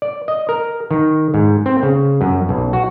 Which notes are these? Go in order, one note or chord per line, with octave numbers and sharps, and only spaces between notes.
D5
D#5
A#4
D#3
G#2
C4
C#3
F#2
B1
F#4